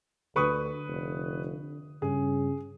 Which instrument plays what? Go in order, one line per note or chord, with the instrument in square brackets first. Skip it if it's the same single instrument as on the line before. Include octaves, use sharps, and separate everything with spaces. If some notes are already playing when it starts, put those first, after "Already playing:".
[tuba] D2 [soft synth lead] D3 [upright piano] B4 C#6 D#6
[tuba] F1
[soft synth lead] G2 [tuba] C#3 [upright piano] G#4